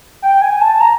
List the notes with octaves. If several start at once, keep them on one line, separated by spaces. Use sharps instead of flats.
G5
G#5
A5
A#5